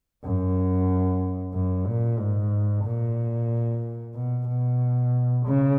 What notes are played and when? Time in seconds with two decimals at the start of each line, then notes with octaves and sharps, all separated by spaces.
0.24 F#2
1.54 F#2
1.87 A#2
2.19 G#2
2.85 A#2
4.15 B2
4.49 B2
5.46 C#3